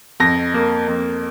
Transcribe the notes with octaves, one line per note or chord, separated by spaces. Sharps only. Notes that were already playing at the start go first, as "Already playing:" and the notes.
F2 A#6
A#3
F2